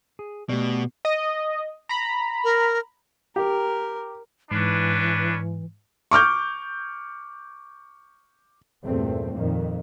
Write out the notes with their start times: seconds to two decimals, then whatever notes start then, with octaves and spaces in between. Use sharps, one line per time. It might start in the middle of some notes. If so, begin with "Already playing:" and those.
0.19 G#4
0.49 B2 A3 G4 D5
1.05 D#5
1.89 A#5 B5
2.44 A#4
3.36 G4 A#4
4.51 G#2 E3 C#4 D4 B4
6.11 C#6 D6 F6 G6
8.84 E2 G2 A#2 A3 C4
9.35 F2 A#2 D#3